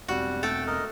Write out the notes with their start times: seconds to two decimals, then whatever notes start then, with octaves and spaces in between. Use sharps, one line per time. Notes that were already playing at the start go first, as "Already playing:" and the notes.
0.08 E1 G3 C4 F#4
0.43 A3 A4 G5
0.67 A#4 D#5